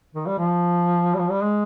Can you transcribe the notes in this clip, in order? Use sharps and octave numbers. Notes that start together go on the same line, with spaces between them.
D#3
G3
F3
G3
F3
G3
G#3